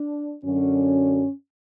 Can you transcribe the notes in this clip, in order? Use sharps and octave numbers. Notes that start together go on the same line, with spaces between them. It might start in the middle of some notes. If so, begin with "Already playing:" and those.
Already playing: D4
F#2 D3 F#3 C#4